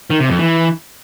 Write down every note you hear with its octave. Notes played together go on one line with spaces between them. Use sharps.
D#3
C3
F2
E3